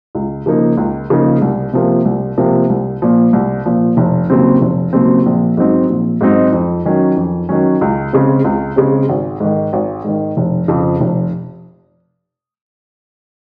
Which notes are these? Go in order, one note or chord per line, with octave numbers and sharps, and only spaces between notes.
C#2
C#3 F3 A#3 D#4
C#2
C#3 F3 A#3 D#4
C2
C3 F3 A#3
C2
C3 F3 A#3
C2
A#2 F3
C2
A#2 F3
F1
D#2 C#3 F#3 C4
F1
D#2 C#3 F#3 C4
A#1
G#2 F#3 C4 D#4
A#1
G#2 F#3 C4 D#4
F2
D#3 F#3 C#4
F2
D#3 F#3 C#4
C#2
C#3 G#3 C4
C#2
C#3 G#3 C4
G#1
G#2 D#3
G#1
G#2 D#3
F1
F2 C#3 F3
F1